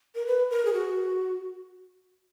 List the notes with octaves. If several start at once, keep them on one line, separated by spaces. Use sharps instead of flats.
A#4
B4
A#4
G#4
F#4